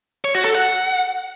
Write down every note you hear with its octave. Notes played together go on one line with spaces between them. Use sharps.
C#5
F#4
A4
F#5